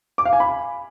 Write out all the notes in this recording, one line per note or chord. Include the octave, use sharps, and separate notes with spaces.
D6
F5
G#5
B5